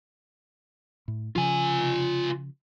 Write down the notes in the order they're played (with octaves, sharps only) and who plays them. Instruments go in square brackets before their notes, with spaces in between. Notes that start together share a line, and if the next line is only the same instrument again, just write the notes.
[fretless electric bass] A2
[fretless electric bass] C#3 F3 [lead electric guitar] F4 G#5